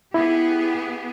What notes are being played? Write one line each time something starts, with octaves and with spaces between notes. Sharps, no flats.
B3 E4 G4 G#4